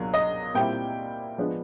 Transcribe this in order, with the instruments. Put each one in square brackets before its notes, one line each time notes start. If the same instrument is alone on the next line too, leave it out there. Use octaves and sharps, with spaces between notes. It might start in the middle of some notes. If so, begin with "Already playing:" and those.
Already playing: [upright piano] C#2 B2 F#3 A#3 D4
D#5
A#2 G3 C4 E4 G5
F3 G#3 B3 D4